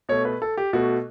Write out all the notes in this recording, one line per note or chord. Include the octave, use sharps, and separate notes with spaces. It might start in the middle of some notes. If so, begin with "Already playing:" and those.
B2 A3 C#5
B4
A4
G4
B2 A3 F#4